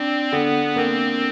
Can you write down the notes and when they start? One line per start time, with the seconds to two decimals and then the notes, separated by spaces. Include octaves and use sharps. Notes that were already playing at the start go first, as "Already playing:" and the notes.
Already playing: C4 D4
0.32 D3 B3
0.76 A#3 C4